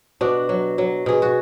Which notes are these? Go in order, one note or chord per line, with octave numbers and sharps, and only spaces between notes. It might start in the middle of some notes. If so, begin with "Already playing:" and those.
B2 D4 F#4
F#3
F#3
B2 G#4
F#4